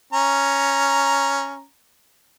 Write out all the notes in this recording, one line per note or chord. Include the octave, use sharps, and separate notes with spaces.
C#4 A#5